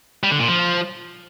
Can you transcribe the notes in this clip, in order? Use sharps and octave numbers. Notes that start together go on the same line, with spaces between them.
G3
D3
A#2
F3